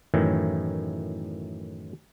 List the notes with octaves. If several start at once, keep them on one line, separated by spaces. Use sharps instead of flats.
F#2 A2 D#3 E3